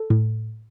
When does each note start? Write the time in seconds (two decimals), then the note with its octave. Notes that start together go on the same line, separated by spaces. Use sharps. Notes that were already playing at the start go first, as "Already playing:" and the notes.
Already playing: A4
0.10 A2